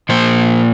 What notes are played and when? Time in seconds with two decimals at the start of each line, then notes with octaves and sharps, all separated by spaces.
0.09 A#2 F3 A#3 C5